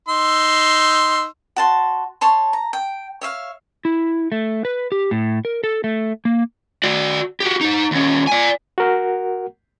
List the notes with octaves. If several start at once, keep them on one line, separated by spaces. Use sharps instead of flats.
D#4 C6 E6
F#4 A5 C6
C#5 A5 C6
A#5
G5
C#5 E5 F5
E4
A3
B4
G4
A2
A#4
A4
A3
A#3
F#4 D5
F#4 G4
D#4 C5
D#2 C#4
D5 G#5
F#4 A#4 F#5